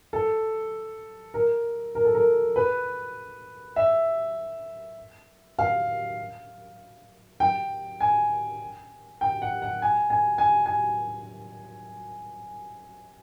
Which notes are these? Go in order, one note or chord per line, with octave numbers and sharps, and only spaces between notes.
A4
A#4
A#4
A4
A#4
B4
E5
F5
G5
G#5
G5
F#5
F#5
G#5
G#5
G#5
G#5